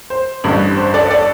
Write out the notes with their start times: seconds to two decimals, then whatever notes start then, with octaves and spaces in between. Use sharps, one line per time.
0.10 C5
0.44 A1 G2 D3
0.77 C5
0.94 A4 D5
1.10 A4 D5